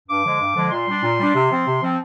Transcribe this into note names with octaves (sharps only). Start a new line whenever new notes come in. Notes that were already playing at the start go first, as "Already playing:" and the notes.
G2 D6
D3 F3 G#3
G2
D3 F3 G#3
A#2 C6
G3 D4
A#2
G3 D4
C3
F3 C4
C3
F3 C4